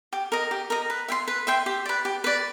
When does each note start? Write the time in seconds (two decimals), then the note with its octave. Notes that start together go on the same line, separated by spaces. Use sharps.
0.13 G4
0.32 A#4 D#5
0.51 G4
0.70 A#4 D#5
0.90 B4
1.08 E5 G5 C6
1.28 B4
1.47 E5 G5 C6
1.66 G4
1.86 B4 D5
2.05 G4
2.24 B4 D5